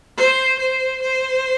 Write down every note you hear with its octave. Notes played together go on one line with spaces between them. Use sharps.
C5
C5
C5